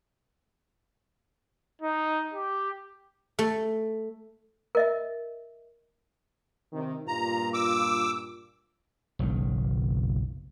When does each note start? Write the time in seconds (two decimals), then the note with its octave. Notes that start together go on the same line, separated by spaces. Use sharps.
1.82 D#4
2.33 G4
3.39 A3
4.75 A#4 D#5 E5
6.73 C3 D#3
7.08 G2 A#2 F4 A#5
7.54 D6 E6
9.19 F#1 B1 D#3